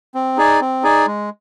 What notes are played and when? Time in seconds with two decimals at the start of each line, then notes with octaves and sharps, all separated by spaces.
0.15 C4
0.37 D#4 G#4 D5 G#5
0.61 C4
0.83 D#4 G#4 D5 G#5
1.07 G#3